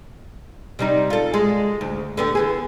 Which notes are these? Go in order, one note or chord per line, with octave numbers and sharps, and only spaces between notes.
C3 G3 D#4
F4 A4
G#3
D2
D3 B3 G4
E3 B3 G#4